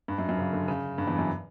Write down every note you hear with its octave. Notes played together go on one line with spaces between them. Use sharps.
G2
F#2
F#2
C#3
D3
C#3
G2
E2
F#2